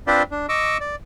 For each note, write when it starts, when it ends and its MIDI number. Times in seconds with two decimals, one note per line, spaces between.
0.07 0.23 60
0.07 0.23 62
0.07 0.23 65
0.07 0.23 71
0.07 0.23 72
0.07 0.23 74
0.31 0.46 62
0.49 0.78 75
0.49 0.78 85
0.49 0.78 86
0.49 0.78 88
0.80 0.96 74